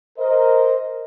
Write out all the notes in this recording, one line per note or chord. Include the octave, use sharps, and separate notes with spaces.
A#4 C5 D#5